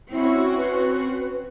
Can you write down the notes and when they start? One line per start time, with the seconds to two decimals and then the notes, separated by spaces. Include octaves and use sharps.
0.11 C4 C#4 E4 F#4
0.57 B4